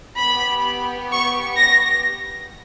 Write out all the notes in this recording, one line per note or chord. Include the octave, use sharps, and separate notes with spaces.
B3 G4 B5
C#6
A#6